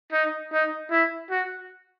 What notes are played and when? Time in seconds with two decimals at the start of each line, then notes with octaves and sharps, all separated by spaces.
0.13 D#4
0.53 D#4
0.91 E4
1.31 F#4